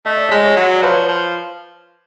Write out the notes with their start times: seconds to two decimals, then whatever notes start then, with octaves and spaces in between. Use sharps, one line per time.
0.06 A3 D#5
0.17 D5
0.29 G#3 C#5 D#5
0.44 C#5 D#5
0.57 F#3
0.73 D5
0.82 F3 B4 C#5
1.09 F3